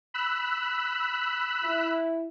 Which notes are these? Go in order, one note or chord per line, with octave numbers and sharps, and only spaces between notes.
B5 E6 F#6
E4